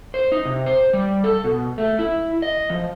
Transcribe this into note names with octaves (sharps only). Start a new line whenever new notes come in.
C5
D#4
C3
C5
G3
A4
B2
A3
E4
D#5
F3